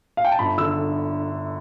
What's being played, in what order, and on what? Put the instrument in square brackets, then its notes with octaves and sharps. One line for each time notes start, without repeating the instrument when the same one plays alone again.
[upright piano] F5
G5
A5
G1 B5
D3 E6